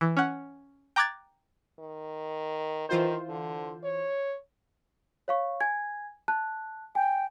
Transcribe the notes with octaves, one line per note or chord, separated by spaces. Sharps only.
E3
C#4 F#5
G5 A#5 D6 F#6 G#6 A6
D#3
D#3 E3 F4 C5
D3
C#5
C#5 F5 C#6
G#5 G#6
A5 F#6
G5 G#5